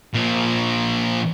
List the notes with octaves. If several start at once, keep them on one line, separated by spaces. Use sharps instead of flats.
A#2 F3